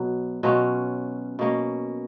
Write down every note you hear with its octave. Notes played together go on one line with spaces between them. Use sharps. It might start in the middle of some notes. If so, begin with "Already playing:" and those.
Already playing: B2 F#3
B2 F#3 C#4 F4
B2 A#3 C#4